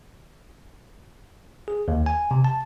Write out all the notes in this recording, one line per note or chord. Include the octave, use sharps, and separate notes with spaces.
G#4
D#2
G#5
C3
A5